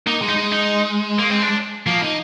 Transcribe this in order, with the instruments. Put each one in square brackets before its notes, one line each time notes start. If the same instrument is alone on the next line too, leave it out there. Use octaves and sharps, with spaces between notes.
[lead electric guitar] A#3 [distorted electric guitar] D#4
[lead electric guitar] G#3
[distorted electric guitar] D#4
[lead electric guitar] G#3
[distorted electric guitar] D#4
A#3
C4
D4
[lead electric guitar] F3 [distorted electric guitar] A#3
[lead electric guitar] D#4